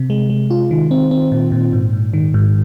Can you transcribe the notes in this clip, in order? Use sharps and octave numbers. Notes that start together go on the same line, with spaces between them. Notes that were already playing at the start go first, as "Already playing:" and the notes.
Already playing: C3
G#3
G#3
F4
D#3
C4
C4
A#2
A#2
G#2
G#2
D#3
G#2